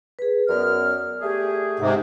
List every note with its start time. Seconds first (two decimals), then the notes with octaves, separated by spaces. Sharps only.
0.19 G#4 B4
0.48 F#2 B3 D5 F6
1.21 A3 G4 G#4
1.79 G#2 C3 F#5